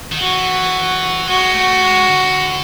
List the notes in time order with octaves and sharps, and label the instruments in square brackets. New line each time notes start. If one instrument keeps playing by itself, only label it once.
[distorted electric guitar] D#3
[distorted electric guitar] E3 [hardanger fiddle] F#4
[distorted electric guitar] G#3 [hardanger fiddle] F#4
[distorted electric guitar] A3
G#3
D3